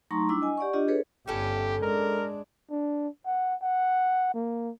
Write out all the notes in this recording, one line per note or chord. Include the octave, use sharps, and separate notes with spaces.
F#3 A3 D#4 A#5 C6 C#6
G3 D4 E4 D6 E6
D#5 G#5
G4 D5 F#5 C#6
D4 F4 G4 D#5
G#4 A4 B4 C#5
G1 C#4 E4 G4 A4
G#3 D4 A#4
D4
F#5
F#5
A#3